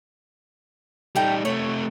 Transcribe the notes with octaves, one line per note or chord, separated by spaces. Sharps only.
G3 A3 D#4 G5
C3 A3 C#5